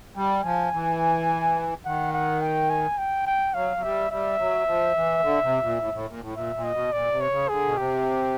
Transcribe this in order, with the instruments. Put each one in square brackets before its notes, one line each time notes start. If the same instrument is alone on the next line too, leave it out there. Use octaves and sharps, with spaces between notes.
[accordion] G3 [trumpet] G5
[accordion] F3 [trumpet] G#5
[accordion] E3
[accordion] D#3 [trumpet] F#5
[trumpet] F#5
G5
G#5
G5
G5
[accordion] F#3 [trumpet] F5
[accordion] F#3
[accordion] G3 [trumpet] E5
[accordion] G3 [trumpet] E5
[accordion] F#3
F3
E3
D3
C3
A#2
A2
A2
A#2
A2
[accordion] A#2 [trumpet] E5
[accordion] A#2
[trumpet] D#5
[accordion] B2
[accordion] A#2 [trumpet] D5
[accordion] C3
[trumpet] C#5
[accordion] C#3
[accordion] D3 [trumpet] G#4
[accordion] B2
[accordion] C3 [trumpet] G4